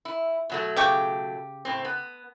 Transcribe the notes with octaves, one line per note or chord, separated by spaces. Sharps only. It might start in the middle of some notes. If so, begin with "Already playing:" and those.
E4
B2 F#3 A3
C#3 G4 C#6
A2 C4
B3